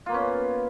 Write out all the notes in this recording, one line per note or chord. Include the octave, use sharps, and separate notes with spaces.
A#3 B3 C#4 F4